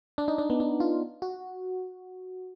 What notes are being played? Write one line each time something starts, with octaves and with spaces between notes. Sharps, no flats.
D4
D#4
D4
B3
D4
F4
F#4